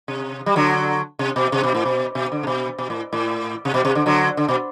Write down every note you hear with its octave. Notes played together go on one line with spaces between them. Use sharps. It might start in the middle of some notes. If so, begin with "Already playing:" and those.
C3
G3
D3 F#3
C3
B2
C3
B2
A2
B2
B2
D3
C3
B2
B2
A2
A2
C3
B2
C3
D3
D3 F#3
D3
B2